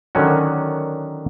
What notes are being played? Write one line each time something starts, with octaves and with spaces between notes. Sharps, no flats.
D3 D#3 F#3 C#4 F#4